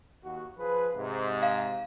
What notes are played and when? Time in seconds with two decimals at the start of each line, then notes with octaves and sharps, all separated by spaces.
0.24 D#2 F#4
0.58 F3 G#4 B4
0.95 G#2 C3
1.42 F5